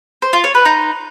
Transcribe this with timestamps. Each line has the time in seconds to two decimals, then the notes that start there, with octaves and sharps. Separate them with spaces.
0.22 C5
0.33 F4
0.44 C#5
0.55 B4
0.65 D#4